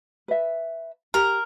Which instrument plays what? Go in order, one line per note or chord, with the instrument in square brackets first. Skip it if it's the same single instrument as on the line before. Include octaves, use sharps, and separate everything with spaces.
[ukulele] B4 E5
[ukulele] G4 [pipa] A#4